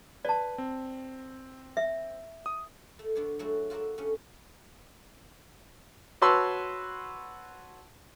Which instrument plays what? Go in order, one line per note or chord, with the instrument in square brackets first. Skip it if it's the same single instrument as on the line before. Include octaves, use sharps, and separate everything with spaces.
[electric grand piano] B4 [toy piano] D5 A5
[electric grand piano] C4
[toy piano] E5
[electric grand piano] D#6
[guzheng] A3
D3 B3 D4 F4 C#5
F#3 G#3 A3 E4 F#4
F4 F#4 A4 A#4 D5 E5
G2 A3 C#4
[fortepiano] F#4 B4 C#5 A5 C6 E6